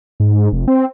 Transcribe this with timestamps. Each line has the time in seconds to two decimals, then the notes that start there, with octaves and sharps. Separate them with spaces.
0.20 G#2
0.52 F1
0.68 C4